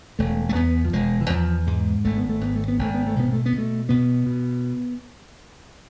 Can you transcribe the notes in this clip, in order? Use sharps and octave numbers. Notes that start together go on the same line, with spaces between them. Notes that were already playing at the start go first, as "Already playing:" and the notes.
E1 A3
A3
E2 B3
F3
E1 G#3
E3
E2 F3
G#2 G#3
G#1 A3
B3
A3
G#1 B3
A3
B3
G#1 A3
B3
A3
B2 B3
A3
B3
B2
A3
B2 B3
B2